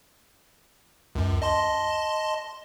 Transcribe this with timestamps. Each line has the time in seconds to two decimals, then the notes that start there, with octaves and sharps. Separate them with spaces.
1.15 C#2 F#2
1.42 D#5 A5 C6